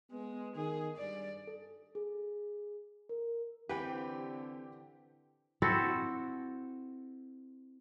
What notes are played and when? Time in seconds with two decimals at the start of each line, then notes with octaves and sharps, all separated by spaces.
0.12 G#3 B3
0.56 D#3 G#4
0.97 G2 D5
1.47 A4
1.95 G#4
3.09 A#4
3.69 D3 E3 C4 G4 B4 G5
5.62 C4 E4 F#4 A4